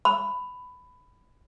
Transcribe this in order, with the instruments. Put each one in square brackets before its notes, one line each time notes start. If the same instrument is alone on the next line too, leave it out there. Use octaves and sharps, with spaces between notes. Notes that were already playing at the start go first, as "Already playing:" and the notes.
[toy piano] B5